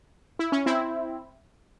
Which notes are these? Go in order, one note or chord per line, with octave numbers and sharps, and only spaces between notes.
E4
C#4
C4 E4